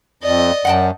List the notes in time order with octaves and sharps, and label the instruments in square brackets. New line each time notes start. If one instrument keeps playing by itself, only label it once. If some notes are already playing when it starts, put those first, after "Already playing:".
[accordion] F2 [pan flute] D5 [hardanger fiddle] D#5
[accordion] F#2 [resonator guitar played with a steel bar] F#5 G5 A5